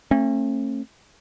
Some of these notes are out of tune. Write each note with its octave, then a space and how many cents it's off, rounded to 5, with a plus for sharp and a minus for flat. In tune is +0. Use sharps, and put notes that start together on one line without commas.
A3 +30 C#4 -45